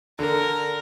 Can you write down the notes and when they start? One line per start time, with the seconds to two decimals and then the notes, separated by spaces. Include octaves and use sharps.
0.19 D3 A#4